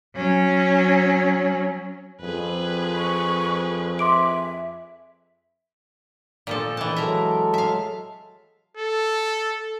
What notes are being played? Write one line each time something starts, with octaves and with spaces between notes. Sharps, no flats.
F#3 C#4
F2 G#4 B4
C#6
E5 C6 D6 D7
A#2 F3 A4
E3 G5 A5 F#6
F#3 G#3 A4 A#4 E5
E5 F5
A4